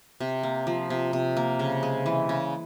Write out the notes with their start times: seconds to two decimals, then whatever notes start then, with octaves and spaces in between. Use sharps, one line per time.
0.20 C3
0.43 A#3
0.67 F3
0.90 C3
1.13 C3
1.37 A#3
1.59 C#3
1.83 G#3
2.06 E3
2.29 C#3